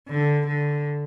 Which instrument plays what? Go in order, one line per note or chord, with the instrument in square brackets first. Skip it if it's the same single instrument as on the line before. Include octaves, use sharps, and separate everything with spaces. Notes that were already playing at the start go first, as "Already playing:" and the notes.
[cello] D3
D3